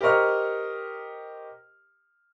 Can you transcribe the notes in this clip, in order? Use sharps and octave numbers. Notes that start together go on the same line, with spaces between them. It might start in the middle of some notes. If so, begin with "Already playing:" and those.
G4 A#4 C5 D#5 C#6 F6